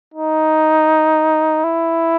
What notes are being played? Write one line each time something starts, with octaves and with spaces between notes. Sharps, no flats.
D#4
E4